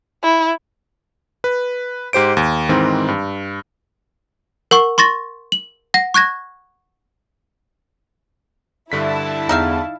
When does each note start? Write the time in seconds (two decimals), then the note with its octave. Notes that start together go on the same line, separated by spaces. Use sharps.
0.24 E4
1.44 B4
2.13 G#2 G4 C5 D7
2.37 D#2
2.69 G#2 D#3 E3 C4
3.08 G2
4.71 A#4 F#5 C#6
4.98 C6 C#6 A6 A#6
5.52 F#7
5.94 F#5 A#6
6.14 C#6 F#6 G#6 A#6
8.92 G2 D3 E4 A5 B6
9.49 E2 D#4 E5 F5